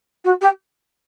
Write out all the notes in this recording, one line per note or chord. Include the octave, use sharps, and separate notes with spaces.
F#4
G4